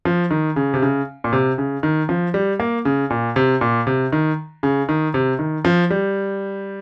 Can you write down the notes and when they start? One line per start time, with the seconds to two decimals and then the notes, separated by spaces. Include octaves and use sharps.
0.05 F3
0.31 D#3
0.56 C#3
0.74 C3
0.82 C#3
1.24 A#2
1.33 C3
1.58 C#3
1.83 D#3
2.09 F3
2.34 G3
2.60 A#3
2.85 C#3
3.10 A#2
3.36 C3
3.61 A#2
3.87 C3
4.13 D#3
4.63 C#3
4.89 D#3
5.14 C3
5.39 D#3
5.65 F3
5.90 G3